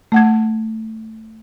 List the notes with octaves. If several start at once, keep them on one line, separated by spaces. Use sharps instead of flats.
A3 F#5 G#6